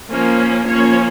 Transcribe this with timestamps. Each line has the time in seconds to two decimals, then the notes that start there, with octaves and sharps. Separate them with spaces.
0.11 F3 A#3 C#4
0.66 F3 A#3 C#4 C#5